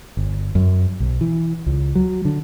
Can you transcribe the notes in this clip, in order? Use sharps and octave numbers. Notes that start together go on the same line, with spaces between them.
G1
F#2
B1
E3
C#2
F#3
D3